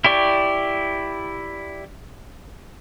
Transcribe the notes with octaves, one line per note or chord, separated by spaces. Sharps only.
E4 G4 D5 C#6